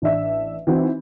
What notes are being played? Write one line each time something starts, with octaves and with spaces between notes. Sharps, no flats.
A1 D4 E5
E3 C4 D#4 F#4